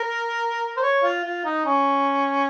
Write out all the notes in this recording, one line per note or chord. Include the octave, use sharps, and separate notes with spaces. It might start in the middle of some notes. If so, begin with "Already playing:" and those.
Already playing: A#4
C5
C#5
F4
F4
D#4
C#4